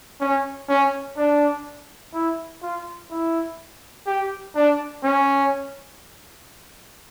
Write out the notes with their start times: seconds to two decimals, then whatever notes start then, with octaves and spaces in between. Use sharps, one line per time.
0.21 C#4
0.69 C#4
1.17 D4
2.14 E4
2.62 F4
3.11 E4
4.07 G4
4.55 D4
5.03 C#4